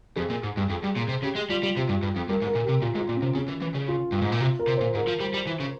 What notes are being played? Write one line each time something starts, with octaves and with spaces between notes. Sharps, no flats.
F2 G#4
A#2
G#2
G2
F2
G2
A#2
C3
C#3 G4
G#3
G3 F4
G3
C3 G4
G2
G2
F2
G2 A#4
G#2
A#4
A#2
G4
C3
A#2 F4
G#2
F4
A#2
C#4
C3
C#3 C#4
E3
E3
C#3
F4
G2
G#2
A#2
C3 F4
A#4
C3
A#2 C5
G#2 A#4
F3
G3
G3
E3
C#3